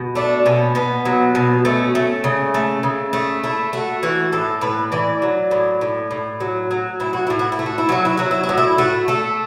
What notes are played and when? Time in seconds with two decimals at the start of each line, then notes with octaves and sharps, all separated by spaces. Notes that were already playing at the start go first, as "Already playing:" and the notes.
Already playing: B2
0.15 A3 D4
0.45 B2 C#4
0.75 B2 B3
1.05 F#3
1.35 B2
1.65 A3 C#4
1.95 A3
2.24 C#3
2.54 A3
2.83 C#3
3.13 A3
3.44 A3 E4
3.73 A3 F#4
4.03 E3 F#4
4.32 A2 A4
4.61 A2 B4
4.92 E3 D5
5.22 F#3
5.51 A2
5.81 A2
6.11 A2
6.40 F#3
6.71 F#3
7.00 A2 E4
7.13 F#4
7.27 A2 E4
7.39 F#4
7.52 E4
7.59 A3
7.66 F#4
7.78 E4
7.89 F#3 F#4
8.05 E4
8.17 F#3 F#4
8.31 E4
8.43 F#4
8.49 A2
8.57 E4
8.78 A3 F#4
9.08 A3 A4